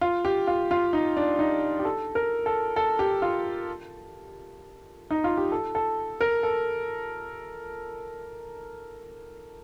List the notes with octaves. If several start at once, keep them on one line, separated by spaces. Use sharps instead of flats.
F4
G4
F4
F4
D#4
D4
D#4
G4
A4
A#4
A4
A4
G4
F4
D#4
F4
G4
A4
A4
A#4
A4